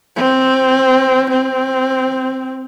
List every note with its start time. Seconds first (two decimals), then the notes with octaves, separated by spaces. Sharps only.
0.16 C4
1.30 C4